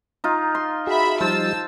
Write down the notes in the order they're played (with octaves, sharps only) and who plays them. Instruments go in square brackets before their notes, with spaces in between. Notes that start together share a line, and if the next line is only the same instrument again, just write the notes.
[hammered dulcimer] D#4 F4
C6
[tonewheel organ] F#4 G#4 [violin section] E5 B5
[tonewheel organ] F3 G3 D#4 [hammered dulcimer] C5 [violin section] A5 E6